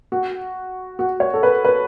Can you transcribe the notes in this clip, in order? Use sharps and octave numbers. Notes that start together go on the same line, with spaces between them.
F#4
F#4
C#5
A4
B4
B4